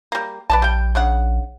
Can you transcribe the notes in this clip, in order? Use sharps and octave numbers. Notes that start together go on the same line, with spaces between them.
G3 A#3
A#1 B4 D5 A5
G3 G5
C#3 D4 F#5